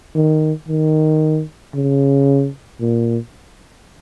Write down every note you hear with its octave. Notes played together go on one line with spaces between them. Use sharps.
D#3
D#3
C#3
A#2